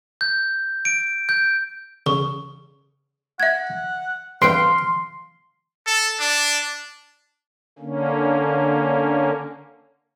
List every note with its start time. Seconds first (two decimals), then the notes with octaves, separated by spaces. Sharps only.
0.21 G6
0.85 D7
1.29 G6
2.06 C#3 C#6
3.40 E5 F#5 G#6
4.42 G2 C3 F5 G5 C6 F#6 D7
5.86 A4
6.20 D4
7.79 D3 A#3 C#4